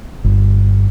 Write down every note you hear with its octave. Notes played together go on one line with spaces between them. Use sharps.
G1